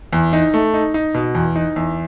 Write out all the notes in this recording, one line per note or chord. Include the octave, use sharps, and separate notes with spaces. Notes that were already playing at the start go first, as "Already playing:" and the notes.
E2
D#4
A3
D#4
D#4
B2
E2
D#4
E2